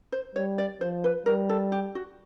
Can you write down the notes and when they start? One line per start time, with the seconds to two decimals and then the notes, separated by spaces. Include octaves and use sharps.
0.12 C5
0.35 G3 C#5
0.58 D5
0.81 F3 C5
1.04 B4
1.26 G3 A#4
1.49 A4
1.72 G4
1.95 F#4